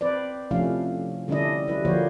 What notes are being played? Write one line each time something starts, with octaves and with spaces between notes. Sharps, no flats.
C4 B4 C5 D5
C3 F3 A3 C#4 E4 F5
D3 G3 C#4 D4 E4 D#5
F#3 G3 E4 B4
D3 F3 A#3 F#4 C5 C#5